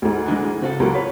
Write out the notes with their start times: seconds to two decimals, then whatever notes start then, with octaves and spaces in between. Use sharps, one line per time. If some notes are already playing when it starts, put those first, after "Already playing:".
0.02 D2 G#2
0.28 D3 E3 G#3
0.62 C#3 C4 F#4 A4
0.80 C#2 F#3 A#4
0.95 B4 C#5